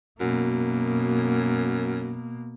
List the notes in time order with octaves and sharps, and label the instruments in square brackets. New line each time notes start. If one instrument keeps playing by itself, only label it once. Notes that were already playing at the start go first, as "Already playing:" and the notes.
[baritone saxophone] F#2 [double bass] B2 A#3